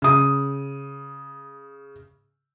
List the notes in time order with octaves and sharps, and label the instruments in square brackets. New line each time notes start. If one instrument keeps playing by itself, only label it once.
[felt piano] C#3 D#6